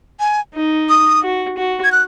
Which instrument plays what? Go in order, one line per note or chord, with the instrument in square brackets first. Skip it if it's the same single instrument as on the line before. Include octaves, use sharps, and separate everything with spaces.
[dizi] G#5
[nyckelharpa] D#4
[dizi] D#6
[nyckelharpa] F#4
F#4
[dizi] G#6
F#6